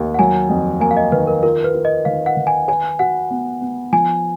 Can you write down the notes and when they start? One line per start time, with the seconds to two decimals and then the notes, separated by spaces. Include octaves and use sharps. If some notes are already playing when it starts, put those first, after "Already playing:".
Already playing: D#2 D#3
0.14 F#5
0.19 F#3 G#5
0.49 F2
0.80 A#3 G#5
0.91 F5
0.97 D#5
1.12 D#3 B4
1.27 A#4
1.43 F4 A#4
1.64 B4
1.74 F4
1.85 D#5
2.05 D#3 F5
2.26 F#5
2.37 D#3
2.47 G#5
2.68 B4 G#5
2.99 F#4 F#5
3.30 B3
3.61 B3
3.92 F3 G#5